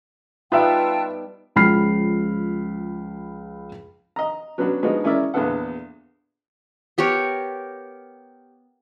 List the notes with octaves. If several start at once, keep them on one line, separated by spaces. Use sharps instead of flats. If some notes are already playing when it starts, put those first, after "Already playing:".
G3 B3 D#4 F4 B4 E5 G5 A5
C#2 F3 B5 F6 C7
D#5 A#5
F#3 B3 C#4 D4 F#4
D3 F3 G#3 B3 D#4 F#4
G#3 C#4 E4 A#4 D5 E5
A#1 E2 D3 B3 A4 F#5
B3 G4 A#4 C#5